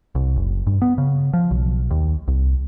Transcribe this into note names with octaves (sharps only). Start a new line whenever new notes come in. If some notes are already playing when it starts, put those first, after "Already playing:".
C2
F#1
G2
B3
C#3
F3
B1
D#2
C2